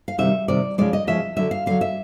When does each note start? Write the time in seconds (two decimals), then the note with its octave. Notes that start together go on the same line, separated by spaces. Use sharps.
0.08 F5
0.18 C3 D#3 G3 E5
0.48 C3 D#3 G3 D5
0.78 C#3 F3 G#3 D5
0.93 D#5
1.07 C#3 F3 G#3 E5
1.37 D3 F#3 E5
1.51 F5
1.66 D3 F#3 F5
1.81 E5